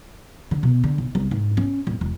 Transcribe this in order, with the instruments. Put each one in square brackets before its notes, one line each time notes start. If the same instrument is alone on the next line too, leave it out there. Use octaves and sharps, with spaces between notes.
[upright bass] D3
B2
D3
B1
C2
G#2
C#4
D1
E1